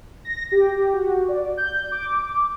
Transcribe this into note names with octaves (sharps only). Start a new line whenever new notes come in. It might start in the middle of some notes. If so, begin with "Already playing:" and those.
A#6
G4
F#4
D5
G6
D6